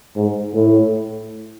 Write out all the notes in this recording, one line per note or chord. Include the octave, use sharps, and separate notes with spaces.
G#2
A2